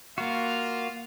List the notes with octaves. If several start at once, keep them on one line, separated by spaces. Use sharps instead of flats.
A#3 F4 F#4 F5